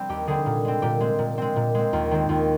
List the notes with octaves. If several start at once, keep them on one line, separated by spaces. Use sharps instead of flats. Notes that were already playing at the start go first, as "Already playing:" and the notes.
Already playing: G3 C4
D#2 G4
D3 G3 C4 G#4
A#2
G#3 C4
A#2 G4
G#3 C4
A#2
G#3 C4
A#2
G#3 C4
D#2 F4
D#3 G#3 C4
D#2 F4